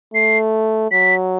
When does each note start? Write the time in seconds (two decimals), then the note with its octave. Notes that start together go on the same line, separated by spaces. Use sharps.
0.14 A3 C7
0.91 F#3 B6